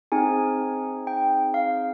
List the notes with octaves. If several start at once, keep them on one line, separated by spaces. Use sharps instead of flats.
C4 D#4 G#4 G#5
G5
F5